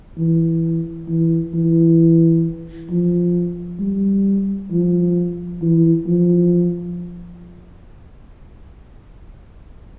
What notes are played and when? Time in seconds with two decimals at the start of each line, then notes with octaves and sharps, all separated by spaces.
0.18 E3
1.08 E3
1.54 E3
2.90 F3
3.80 G3
4.71 F3
5.62 E3
6.06 F3